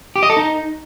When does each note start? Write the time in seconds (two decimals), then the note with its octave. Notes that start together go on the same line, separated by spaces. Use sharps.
0.16 G4
0.23 D#5
0.30 A4
0.37 D#4